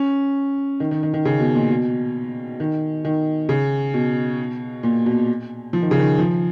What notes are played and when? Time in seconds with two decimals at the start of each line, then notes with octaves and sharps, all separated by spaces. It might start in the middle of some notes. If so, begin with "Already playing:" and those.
Already playing: C#4
0.80 D#3
0.91 D#3
1.03 D#3
1.14 D#3
1.25 C#3
1.40 B2
1.55 A#2
1.70 B2
2.60 D#3
3.05 D#3
3.49 C#3
3.94 B2
4.83 A#2
5.06 B2
5.73 F3
5.82 D#3
5.91 C#3
5.99 D#3
6.18 F3